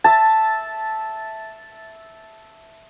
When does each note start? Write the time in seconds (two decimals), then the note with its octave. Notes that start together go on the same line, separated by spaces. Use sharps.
0.04 E5 A5